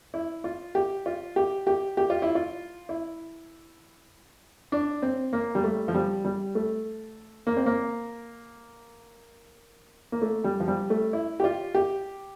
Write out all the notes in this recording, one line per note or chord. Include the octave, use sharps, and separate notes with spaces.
E4
F4
G4
F4
G4
G4
G4
F4
E4
F4
E4
D4
C4
A#3
G3
A3
F3
G3
G3
A3
A#3
C4
A#3
A#3
A3
G3
F3
G3
A3
E4
G4
F4
G4